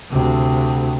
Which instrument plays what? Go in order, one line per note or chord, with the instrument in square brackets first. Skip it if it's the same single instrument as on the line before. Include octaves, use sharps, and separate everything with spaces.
[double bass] D2 C3